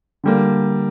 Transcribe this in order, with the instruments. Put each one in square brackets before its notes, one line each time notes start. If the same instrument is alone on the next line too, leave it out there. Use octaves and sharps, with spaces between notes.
[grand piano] D3 G3 A#3